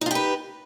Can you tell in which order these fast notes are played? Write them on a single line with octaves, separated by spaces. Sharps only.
D#4 F4 G4 B4